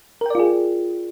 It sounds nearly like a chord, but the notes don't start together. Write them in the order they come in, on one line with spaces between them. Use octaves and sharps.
A#4 G5 D5 F4 G#4